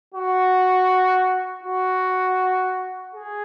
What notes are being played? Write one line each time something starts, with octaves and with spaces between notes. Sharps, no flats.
F#4
F#4
G#4